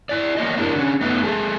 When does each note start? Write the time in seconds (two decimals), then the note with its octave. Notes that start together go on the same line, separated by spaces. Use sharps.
0.09 E4 D5
0.37 F#3 A#3 G4 D#5
0.58 D4 E4 G4 A#4
0.75 D3 C#4
1.01 A3 B3 D#4 B4
1.23 G#3 G#4 A4